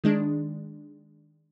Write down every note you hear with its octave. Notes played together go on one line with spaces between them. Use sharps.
D#3 G#3 D4